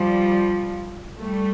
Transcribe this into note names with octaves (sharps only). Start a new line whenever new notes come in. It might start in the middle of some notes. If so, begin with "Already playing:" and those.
Already playing: F3 G3
G3 A3